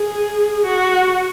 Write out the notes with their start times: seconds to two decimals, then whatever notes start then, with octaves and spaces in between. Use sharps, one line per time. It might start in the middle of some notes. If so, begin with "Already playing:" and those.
Already playing: G#4
0.65 F#4